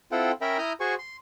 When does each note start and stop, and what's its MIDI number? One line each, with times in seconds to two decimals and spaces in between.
0.12 0.32 60
0.12 0.32 64
0.12 0.32 65
0.12 0.32 69
0.12 0.32 78
0.12 0.32 79
0.41 0.58 61
0.41 0.58 70
0.41 0.58 76
0.41 0.58 79
0.41 0.58 82
0.41 0.58 83
0.58 0.73 64
0.58 0.73 82
0.58 0.73 87
0.58 0.73 89
0.58 0.73 91
0.80 0.95 66
0.80 0.95 68
0.80 0.95 72
0.80 0.95 80
0.80 0.95 85
0.98 1.17 84